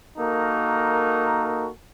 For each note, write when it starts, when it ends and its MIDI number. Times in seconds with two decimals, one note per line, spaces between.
0.19 1.69 58
0.19 1.69 63
0.19 1.69 66
0.19 1.69 69
0.19 1.69 70